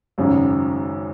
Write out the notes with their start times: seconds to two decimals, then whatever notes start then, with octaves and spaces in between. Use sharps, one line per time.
0.18 G#1 F#2 C#3